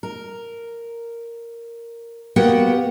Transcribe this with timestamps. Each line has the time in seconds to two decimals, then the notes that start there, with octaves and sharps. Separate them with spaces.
0.03 A#4
2.36 A#3 B3 F#4 G4 F#5 G5